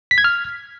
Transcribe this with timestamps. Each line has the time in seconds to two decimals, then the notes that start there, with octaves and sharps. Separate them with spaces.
0.11 B6
0.18 G#6
0.24 F6